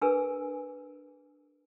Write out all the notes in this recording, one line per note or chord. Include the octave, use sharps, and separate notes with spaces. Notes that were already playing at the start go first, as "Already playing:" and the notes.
D4 G#4 A#4 B4 G#5 E6